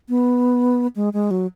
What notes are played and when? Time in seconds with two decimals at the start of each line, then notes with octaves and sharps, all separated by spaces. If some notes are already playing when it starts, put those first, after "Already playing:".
0.09 B3
0.96 G#3
1.13 G#3
1.31 F#3